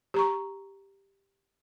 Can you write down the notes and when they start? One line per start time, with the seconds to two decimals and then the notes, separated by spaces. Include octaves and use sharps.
0.14 G4 A#5 C#6